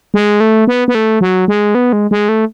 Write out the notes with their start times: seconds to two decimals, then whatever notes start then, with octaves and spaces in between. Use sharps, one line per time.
0.14 G#3
0.40 A3
0.67 B3
0.88 B3
0.95 A3
1.21 F#3
1.48 G#3
1.75 B3
1.93 G#3
2.11 G#3
2.29 A3